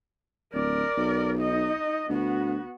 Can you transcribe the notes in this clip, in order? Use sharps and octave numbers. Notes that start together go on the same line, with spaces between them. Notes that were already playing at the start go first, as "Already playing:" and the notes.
D1 A#4 D5
B1
D#4 D#5
D2 B3 F#4